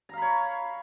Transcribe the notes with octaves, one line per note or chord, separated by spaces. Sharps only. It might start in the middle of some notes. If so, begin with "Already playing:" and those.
C#5 F5 A#5 B5